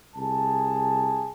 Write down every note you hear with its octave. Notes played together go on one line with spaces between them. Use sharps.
C2 G#4 A5